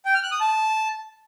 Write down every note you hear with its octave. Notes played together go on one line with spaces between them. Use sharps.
G5
F6
F#6
D#6
A5